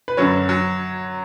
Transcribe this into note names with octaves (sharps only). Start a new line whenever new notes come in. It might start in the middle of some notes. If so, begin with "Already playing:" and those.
B4
F#2 D3 F#3 C#5
F#3